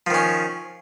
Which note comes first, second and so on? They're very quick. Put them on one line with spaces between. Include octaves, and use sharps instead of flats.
F3 D#3 C#4